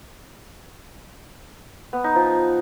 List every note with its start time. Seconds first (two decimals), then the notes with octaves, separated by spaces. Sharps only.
1.93 B3
2.04 D#4
2.15 F3